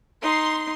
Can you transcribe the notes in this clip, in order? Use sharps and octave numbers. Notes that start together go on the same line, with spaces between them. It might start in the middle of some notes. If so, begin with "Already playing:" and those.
D#4 C6